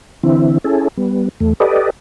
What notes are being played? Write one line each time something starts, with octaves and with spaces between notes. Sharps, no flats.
D3 E3 C4 E4
C#4 E4 G#4 A4
G3 B3
E2 A3
G4 A4 B4 D5 D#5